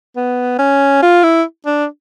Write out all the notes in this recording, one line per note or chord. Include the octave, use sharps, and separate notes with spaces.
B3
C#4
F4
E4
D4